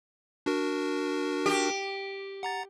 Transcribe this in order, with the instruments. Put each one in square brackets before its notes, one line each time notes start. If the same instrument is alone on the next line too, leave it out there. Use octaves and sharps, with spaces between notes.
[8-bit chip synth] D4 F#4 A#4
[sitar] G4
[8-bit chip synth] F#5 A#5 A6